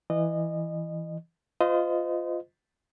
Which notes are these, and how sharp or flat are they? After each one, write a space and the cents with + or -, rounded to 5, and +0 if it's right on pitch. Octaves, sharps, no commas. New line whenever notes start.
E3 +0 D#5 -25
F4 +0 C5 -35 D#5 +0